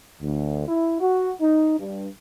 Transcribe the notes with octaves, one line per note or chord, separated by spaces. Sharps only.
D2
E4
F#4
D#4
G2